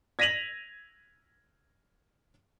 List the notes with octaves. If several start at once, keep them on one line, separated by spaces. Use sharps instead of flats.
G#6 A#6 B6 D#7 F7 F#7